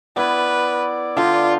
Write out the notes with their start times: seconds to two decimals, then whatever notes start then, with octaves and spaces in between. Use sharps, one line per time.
0.16 B3 E4 B4 D5
1.17 D3 F4 D#5 G5